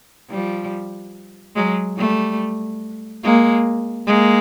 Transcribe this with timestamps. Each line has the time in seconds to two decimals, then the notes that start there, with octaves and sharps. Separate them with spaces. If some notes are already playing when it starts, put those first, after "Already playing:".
0.30 F3 G3
1.56 F#3 G#3
1.98 G3 A3
3.23 G#3 A#3
4.07 G#3 A#3